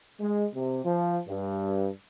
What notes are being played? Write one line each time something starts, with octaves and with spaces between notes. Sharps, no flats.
G#3
C3
F3
G2